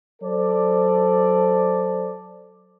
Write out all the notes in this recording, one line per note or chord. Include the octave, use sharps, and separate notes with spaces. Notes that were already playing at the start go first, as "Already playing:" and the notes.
F#3 A4 C5 D5